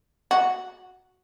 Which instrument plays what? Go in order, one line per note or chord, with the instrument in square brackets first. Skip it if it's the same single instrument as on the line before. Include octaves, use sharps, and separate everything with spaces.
[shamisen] F#4